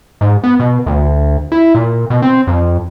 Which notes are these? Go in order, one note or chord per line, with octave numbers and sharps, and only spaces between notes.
G#2
B3
B2
D2
E4
A#2
B2
C4
F2